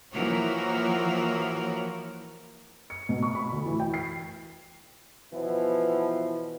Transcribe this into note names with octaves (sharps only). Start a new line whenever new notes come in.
E3 F3 A#3 F#4 A#4 C#5
C#7
B2
C#6
B5
D2
E3
G5
C7
B2 E3 F3 B3 E4